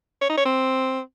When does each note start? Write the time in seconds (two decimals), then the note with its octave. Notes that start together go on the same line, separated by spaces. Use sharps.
0.21 C#5
0.29 D#4
0.37 C#5
0.45 C4